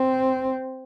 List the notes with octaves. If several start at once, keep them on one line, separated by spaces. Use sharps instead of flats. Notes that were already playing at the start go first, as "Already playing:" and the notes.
Already playing: C4